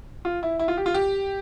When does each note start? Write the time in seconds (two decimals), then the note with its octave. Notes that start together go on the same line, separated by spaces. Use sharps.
0.25 F4
0.43 E4
0.59 E4
0.68 F4
0.77 G4
0.86 F4
0.94 G4